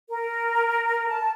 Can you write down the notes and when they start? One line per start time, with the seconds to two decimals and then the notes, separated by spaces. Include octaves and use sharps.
0.09 A#4
1.09 A5